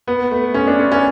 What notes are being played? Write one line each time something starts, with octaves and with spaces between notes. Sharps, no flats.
B3
A3
C#4
D4
C#4
C#4